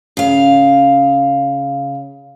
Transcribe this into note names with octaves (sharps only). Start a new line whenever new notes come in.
C#3 F5